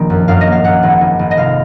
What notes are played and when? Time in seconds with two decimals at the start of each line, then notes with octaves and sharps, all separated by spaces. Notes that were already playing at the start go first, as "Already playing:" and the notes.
Already playing: A#1 D#3 A#3
0.10 F#2
0.28 F#2 F5
0.41 D#5
0.47 A#3
0.52 F5
0.64 F#2 F#5
0.83 G#1
1.01 G#1
1.19 G#1
1.31 D#5
1.37 F1 F5